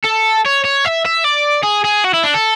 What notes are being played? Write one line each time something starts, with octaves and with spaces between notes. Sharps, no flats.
A4
C#5
C#5
E5
E5
D5
G#4
G#4
F#4
E4
D4
A4